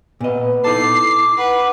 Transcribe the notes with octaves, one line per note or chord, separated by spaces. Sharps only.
A#2 B3 D#5
D#4 E4 A4 A5 D6 C7
B4 F#5